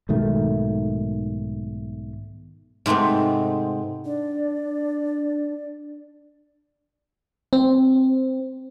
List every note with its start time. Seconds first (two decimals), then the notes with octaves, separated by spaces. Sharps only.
0.09 B1 G#2 D#3 A3
2.86 G#2 C3 A3 B3 C4
4.04 D4 D5
7.53 C4